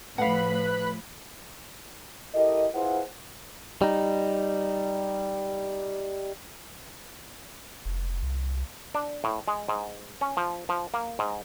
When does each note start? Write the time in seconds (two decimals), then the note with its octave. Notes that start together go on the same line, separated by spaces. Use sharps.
0.18 A2 F3 B4 F5 F#5 B5 F#6
2.34 E4 G4 A4 A#4 D#5
2.73 E4 F4 G#4 B4 C5 F#5
3.82 G3 D#4
7.85 F1
8.22 C2
8.95 D4
9.24 A2
9.48 G#3
9.69 G#2
10.21 C#4
10.37 F3
10.69 F3
10.94 A#3
11.19 G#2